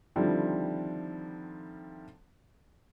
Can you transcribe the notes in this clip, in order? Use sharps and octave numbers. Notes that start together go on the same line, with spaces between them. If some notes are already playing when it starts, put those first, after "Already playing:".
D3 D#3 F3 G3 C4 E4